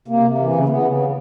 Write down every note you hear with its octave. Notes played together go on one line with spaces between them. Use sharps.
C3 A#3
C3
E3
C#3
A#3
C#3 B3
C#3